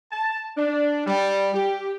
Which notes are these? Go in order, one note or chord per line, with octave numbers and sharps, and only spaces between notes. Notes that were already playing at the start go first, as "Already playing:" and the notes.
A5
D4
G3
G4